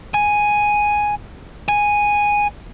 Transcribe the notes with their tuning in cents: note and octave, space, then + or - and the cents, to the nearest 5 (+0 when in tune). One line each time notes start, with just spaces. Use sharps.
G#5 +0
G#5 -5